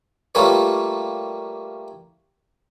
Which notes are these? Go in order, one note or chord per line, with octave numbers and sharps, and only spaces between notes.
G3 A3 A#3 F4 B4 C#5